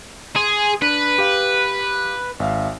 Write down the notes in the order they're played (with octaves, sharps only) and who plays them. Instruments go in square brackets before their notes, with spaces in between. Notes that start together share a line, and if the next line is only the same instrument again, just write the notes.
[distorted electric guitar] G#4 [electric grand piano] C6
[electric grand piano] D4 [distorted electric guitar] B4
[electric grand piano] G4 F5
G#1 E5 F5